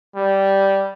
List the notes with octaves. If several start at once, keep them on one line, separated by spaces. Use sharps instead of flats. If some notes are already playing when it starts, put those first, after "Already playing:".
G3